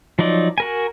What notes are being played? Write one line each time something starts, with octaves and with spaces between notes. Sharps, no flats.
F3 F#3 D#4 D5
F#4 A#4 G#5